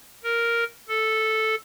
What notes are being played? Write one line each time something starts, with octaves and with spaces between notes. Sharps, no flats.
A#4
A4